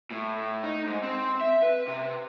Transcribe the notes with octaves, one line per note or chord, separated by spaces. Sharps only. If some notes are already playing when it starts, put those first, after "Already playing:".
A2
D#4
G#2
C4
E5
B4
C3